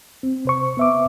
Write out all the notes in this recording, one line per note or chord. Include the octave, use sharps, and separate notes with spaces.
C4
C3 C5 C#6
B3 E5 D6